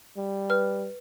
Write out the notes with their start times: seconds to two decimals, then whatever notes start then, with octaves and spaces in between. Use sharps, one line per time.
0.17 G3
0.50 B4 F6